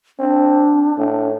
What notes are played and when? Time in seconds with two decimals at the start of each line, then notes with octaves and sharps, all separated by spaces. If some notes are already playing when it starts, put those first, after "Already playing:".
0.19 C4 D4
0.98 A2